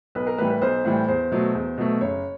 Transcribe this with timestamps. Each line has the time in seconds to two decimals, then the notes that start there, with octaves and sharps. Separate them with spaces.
0.15 B1 B4
0.27 A#4
0.38 A2 E3 G3 B4
0.50 B4
0.61 B1 C5
0.85 A2 E3 G3
1.08 E2 C5
1.31 B2 F#3 A3
1.54 E2
1.78 B2 F#3 A3
2.01 F#1 C#5